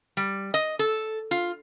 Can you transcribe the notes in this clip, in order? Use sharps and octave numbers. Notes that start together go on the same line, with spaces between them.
G3
D#5
A4
F4